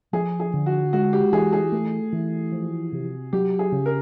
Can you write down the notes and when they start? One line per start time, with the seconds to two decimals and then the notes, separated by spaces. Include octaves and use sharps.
0.13 F3 G#4
0.40 G#4
0.54 D3
0.66 F#4
0.93 G#3 F#4
1.13 G4
1.32 E3 G#4
1.53 G#4
1.72 A3
2.13 E3
2.52 F3
2.92 C3
3.33 F#3 G4
3.59 G#4
3.72 C#3
3.86 A#4